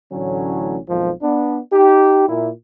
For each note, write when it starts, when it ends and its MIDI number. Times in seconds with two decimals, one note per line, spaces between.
0.12 0.78 33
0.12 0.78 45
0.12 0.78 50
0.12 0.78 54
0.12 0.78 61
0.89 1.12 35
0.89 1.12 41
0.89 1.12 44
0.89 1.12 51
0.89 1.12 53
1.22 1.59 59
1.22 1.59 62
1.73 2.28 63
1.73 2.28 67
2.28 2.49 46
2.28 2.49 64